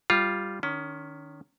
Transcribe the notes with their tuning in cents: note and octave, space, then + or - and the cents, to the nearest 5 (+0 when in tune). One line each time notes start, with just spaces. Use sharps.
G3 +0 F4 +0
D#3 -20 C#4 +25